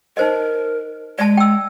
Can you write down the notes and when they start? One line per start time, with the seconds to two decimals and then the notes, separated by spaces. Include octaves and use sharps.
0.17 D#4 A#4 C5 D#5
1.19 G#3 D5 A5
1.37 G5 E6